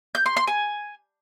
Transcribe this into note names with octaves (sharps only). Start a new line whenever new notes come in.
G6
C6
C6
G#5